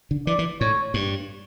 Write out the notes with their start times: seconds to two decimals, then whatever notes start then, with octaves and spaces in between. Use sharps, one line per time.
0.11 D3
0.27 E3 D5
0.39 E3
0.61 A2 C#5
0.94 G2